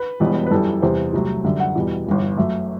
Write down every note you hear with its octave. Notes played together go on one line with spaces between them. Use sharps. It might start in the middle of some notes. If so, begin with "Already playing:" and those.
Already playing: B4
E1 E2 B2 G3
B4
F#2 E3 G3 A4
E2 C3 G3 C5
C2 C3 F#3 A3
F#2 D3 G3 E5
F#5
E2 B2 G3
G1 G2 E3
F#2 F#3 A3 E5